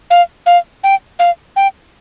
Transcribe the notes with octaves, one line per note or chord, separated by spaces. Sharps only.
F5
F5
G5
F5
G5